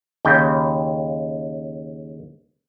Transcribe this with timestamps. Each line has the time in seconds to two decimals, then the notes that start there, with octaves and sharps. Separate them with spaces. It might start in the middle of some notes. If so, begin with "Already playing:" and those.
0.25 D#2 C#3 G5